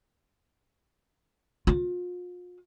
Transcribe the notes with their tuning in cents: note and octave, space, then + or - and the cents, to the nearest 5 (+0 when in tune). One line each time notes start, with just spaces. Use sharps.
F4 +35